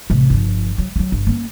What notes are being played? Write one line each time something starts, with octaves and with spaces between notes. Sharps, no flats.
A1 C3
G1 F3
F#3
F#3 A3
G1
A#3 C#4